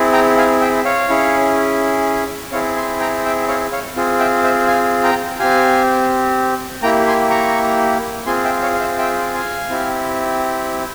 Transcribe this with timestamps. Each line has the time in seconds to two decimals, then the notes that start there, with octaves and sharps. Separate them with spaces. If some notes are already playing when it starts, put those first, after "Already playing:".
Already playing: C4 E4 G#4
0.13 G5 A#5
0.37 F5 G#5
0.61 E5 G5
0.85 C#5 F5
1.09 C#4 E4 G#4
2.52 C4 E4 G#4 C#5 F5
2.76 G#5 C6
3.00 G5 A#5
3.25 E5 G5
3.48 C#5 F5
3.72 C#5 F5
3.96 C4 F4 G#4
4.19 E5 G5
4.44 C5 E5
4.67 F5 G#5
5.04 G5 A#5
5.39 C4 G4 F5 G#5
6.83 A#3 E4 G4 G5 A#5
7.07 G#5 C6
7.30 A#5 C#6
8.26 C4 F4 G#4 G#5 C6
8.45 E5 G5
8.62 C#5 F5
8.74 F5
8.80 C5 E5
8.98 E5 G5
9.34 F5 G#5
9.69 C4 E4 G4